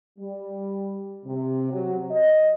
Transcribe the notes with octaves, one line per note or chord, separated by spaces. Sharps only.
G3
C3
F#3
D#5